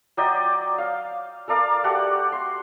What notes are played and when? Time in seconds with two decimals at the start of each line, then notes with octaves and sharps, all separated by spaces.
0.17 F#3 D5 D#5 G5
0.78 F5
1.48 A4 A#4 D5 F5
1.84 A3 F#4 G4 F#5
2.32 C6